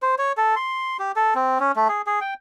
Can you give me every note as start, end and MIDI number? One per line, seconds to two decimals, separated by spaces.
0.02 0.15 72
0.18 0.32 73
0.37 0.55 69
0.56 0.97 84
0.99 1.12 67
1.16 1.34 69
1.35 1.58 60
1.60 1.72 61
1.76 1.88 57
1.89 2.02 68
2.07 2.20 68
2.21 2.34 79